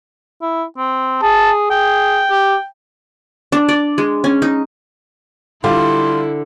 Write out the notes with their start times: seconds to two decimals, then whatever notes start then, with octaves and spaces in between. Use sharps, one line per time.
0.42 E4
0.78 C4
1.22 G#4 A5
1.70 G#4 G5
2.30 G4
3.52 D4
3.69 D5
3.98 G#3
4.24 C#4
4.42 D#4
5.64 D3 G3 E4 F4 C6